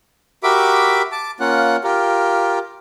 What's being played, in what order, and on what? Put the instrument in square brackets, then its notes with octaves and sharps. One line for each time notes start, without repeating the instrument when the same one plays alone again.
[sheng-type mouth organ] F#4 G4 A#4 E5 B5 D6
A5 D6
A#3 C#4 F4 F#5
F4 G4 A#4